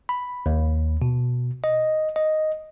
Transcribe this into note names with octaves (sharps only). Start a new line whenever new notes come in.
B5
D#2
B2
D#5
D#5